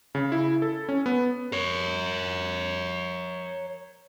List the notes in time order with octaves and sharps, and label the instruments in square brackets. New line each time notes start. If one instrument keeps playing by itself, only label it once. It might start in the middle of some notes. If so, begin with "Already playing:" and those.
[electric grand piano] C#3
E4
A4
C#4
B3
[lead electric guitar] A#4 C#5